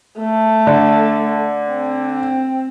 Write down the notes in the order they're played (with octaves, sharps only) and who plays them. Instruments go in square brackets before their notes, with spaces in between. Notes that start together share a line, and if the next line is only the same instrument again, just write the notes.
[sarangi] A3
[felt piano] D3
[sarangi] C4